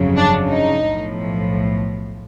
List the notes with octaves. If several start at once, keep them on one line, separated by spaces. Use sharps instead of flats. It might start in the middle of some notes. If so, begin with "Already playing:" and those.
Already playing: G1 F2 C#3 F#3
D4
D#4
B1 A2 F3